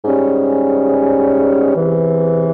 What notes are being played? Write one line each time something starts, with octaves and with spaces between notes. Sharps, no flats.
G#2 G3 C#4
E2 C3 E3